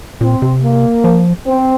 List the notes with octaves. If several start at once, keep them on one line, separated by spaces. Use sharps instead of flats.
A#2 C4
C3
A#3
F3
C4